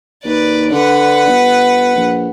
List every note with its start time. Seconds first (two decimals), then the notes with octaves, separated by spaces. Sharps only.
0.24 D#2 B4 D5
0.72 D3 B4 F#5
1.27 G1
1.96 A#1